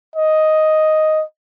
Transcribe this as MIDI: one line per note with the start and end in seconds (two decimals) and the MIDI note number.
0.16 1.24 75